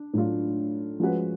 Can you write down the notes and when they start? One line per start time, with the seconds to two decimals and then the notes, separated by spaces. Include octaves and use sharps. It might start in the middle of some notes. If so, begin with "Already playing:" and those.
Already playing: D4
0.13 A2 F#3 A3 D4 F4
1.00 F3 G#3 C#4 F#4 B4